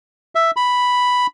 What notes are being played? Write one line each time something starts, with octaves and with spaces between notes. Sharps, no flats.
E5
B5